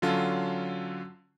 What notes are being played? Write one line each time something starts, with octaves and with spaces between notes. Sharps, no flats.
D3 F#3 C#4 F4 A4